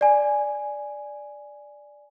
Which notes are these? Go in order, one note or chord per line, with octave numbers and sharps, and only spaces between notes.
D5 G#5